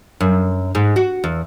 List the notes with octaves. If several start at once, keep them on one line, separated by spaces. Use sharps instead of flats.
F#2
G#2
F#4
E2